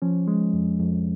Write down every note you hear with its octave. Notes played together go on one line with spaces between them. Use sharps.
F3 C#4
G#3
F2
F2